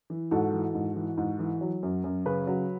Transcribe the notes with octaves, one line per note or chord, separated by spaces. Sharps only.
E3
G#2 F#4 A4
E3
G#2
E3
G#2
E3
F#3
F#2
F#2
C#3 G#4 B4
F#3